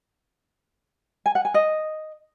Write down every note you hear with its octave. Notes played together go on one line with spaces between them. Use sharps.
G#5
F#5
G#5
D#5